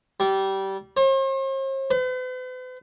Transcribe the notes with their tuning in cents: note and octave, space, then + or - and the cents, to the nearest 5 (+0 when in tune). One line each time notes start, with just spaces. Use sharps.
G3 -20
C5 +45
B4 +45